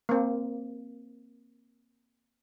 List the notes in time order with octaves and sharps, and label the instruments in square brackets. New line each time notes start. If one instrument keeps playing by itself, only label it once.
[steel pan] A#3 C4